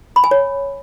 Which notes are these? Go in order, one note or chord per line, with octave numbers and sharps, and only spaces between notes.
B5
G#5
C#5